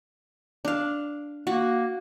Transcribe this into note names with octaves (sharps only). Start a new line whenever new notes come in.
D4 F5
A#3 F#4